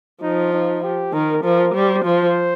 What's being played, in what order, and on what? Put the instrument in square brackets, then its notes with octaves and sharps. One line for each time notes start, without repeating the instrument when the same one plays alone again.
[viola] F3 [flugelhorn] D#4
[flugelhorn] D#4
G4
[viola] D#3 [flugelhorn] A#4
[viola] F3 [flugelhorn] A#4
[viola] G3 [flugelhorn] C5
[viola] F3 [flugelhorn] C5